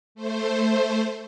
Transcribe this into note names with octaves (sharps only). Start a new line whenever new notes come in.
A3 C5